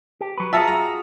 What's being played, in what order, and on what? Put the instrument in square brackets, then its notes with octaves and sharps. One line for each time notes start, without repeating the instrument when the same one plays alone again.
[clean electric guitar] G4
F#3 B4
[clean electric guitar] F4 F#4 G#4 [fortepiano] E5 A5 A#5
[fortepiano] A#5